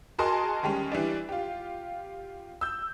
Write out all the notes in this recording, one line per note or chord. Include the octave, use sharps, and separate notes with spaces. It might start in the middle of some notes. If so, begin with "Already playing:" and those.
F#4 G#4 A#4 D#5 A5 C6
D#3 G3 G#3 C#4
E3 G3 D4
F4 G4
E6 G6